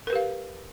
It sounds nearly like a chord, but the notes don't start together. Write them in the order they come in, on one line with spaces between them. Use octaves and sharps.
A#4 B4 G4 F5